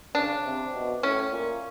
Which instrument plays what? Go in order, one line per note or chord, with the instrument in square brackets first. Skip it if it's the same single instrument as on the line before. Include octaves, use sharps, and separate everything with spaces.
[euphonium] C#3 [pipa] D4
[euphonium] C3
B2
[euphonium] A2 [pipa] C#4
[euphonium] A#2